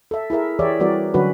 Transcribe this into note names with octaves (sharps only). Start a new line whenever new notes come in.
A4 E5
E4 G#4 A#4 E5
E3 G4 G#4 C#5 D5 E5
E3 G3 C4 F#4 A#4 D5
D3 F#3 C#4 F#4 B4